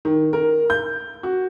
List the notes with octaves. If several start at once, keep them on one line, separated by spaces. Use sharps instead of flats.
D#3
A#4
G6
F#4